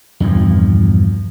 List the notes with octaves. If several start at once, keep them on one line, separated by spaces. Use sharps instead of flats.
E2 G2 A#2 F3